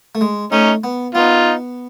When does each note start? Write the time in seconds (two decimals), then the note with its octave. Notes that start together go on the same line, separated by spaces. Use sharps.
0.15 A3
0.21 G#3
0.52 A3 C#4 D#4
0.84 B3
1.15 B3 D#4 F4